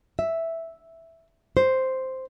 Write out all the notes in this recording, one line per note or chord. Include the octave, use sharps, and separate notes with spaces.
E5
C5